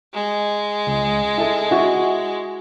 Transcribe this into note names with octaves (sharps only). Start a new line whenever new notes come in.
G#3
C#2
E4 A4
E4 F#4